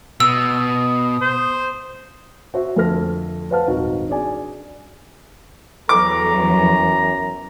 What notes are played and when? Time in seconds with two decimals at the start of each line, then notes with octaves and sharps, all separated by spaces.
0.20 B2 D#6 E6
1.21 C5
2.54 F#4 C5 E5
2.76 F2 D3 A3 A4 F6 A#6
3.51 B4 C5 F5 F#5 A5 F6
3.68 D#1 G#1 D#4 F#4
4.09 D4 F#4 G#4 D5 G#5
5.89 E2 E3 F#3 A4 A#5 D6
6.31 F#2